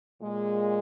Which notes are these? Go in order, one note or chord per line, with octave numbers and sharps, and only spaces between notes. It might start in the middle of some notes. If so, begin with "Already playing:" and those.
A#2 G#3